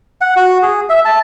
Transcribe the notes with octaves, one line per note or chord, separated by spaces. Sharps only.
F#5
F#4
G#4
E5
A5